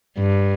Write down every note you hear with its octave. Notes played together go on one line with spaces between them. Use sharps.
G2